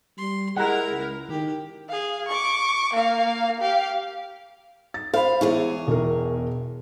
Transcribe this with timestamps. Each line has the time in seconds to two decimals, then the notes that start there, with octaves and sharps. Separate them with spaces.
0.18 G3 C6
0.56 G#3 E4 A#4 F#5 A#5
0.91 C#2
1.30 D#3 G4
1.89 G#4 F5
2.28 C#6 D6
2.93 A#3 F5
3.60 G4 F5
4.94 A6
5.14 C5 F5 B5
5.41 E2 E4 G#4 C#5
5.87 E1 A#4